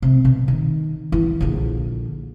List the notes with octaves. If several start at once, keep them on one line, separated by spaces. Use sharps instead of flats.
C3
B2
D#3
E3 E4
A#1 D3